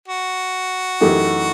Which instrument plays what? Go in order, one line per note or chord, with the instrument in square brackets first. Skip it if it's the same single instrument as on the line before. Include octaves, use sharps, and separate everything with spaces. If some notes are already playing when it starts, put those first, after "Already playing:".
[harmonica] F#4
[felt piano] F#2 E3 A3 D#4 G4